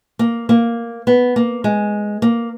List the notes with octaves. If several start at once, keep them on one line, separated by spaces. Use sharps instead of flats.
A#3
A#3
B3
A#3
G#3
A#3